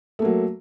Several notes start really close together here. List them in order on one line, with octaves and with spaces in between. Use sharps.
A3 A#3 F#3